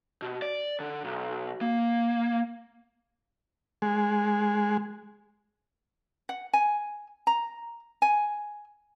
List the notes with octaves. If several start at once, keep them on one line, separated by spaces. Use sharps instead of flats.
B2
D5
D3
B1
A#3
G#3
F#5
G#5
A#5
G#5